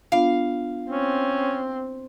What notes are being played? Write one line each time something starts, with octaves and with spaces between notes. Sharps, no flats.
B3 D4 F4 F5
C4 C#4